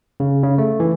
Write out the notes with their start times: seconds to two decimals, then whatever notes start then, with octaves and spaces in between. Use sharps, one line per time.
0.20 C#3
0.43 C#3
0.58 A3
0.80 E3